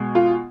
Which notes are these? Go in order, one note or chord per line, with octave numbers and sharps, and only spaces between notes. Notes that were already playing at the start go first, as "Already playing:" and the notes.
Already playing: B2 G#3
F4